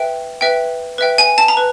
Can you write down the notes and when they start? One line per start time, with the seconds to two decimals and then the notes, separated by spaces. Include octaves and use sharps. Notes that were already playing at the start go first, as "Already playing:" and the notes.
Already playing: B4 E5 G5
0.41 B4 E5 G5
0.98 B4 E5 G5
1.18 G#5
1.38 A5
1.48 A#5
1.57 B4